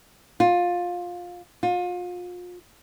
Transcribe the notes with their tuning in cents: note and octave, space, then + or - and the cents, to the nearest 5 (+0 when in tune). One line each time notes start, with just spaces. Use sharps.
F4 +15
F4 +35